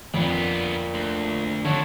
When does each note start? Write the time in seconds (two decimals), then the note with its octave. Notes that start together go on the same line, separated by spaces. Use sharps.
0.14 F2 A#2 D3 B3
0.94 D2
1.65 D3 F3 F#3 C#5 A5